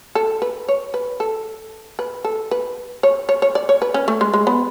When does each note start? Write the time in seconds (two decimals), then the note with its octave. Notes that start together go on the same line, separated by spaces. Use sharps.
0.15 A4
0.42 B4
0.68 C#5
0.94 B4
1.20 A4
1.99 B4
2.24 A4
2.51 B4
3.03 C#5
3.29 C#5
3.42 C#5
3.55 D5
3.69 C#5
3.82 B4
3.94 C#4
4.08 A3
4.21 G#3
4.34 G#3
4.47 B3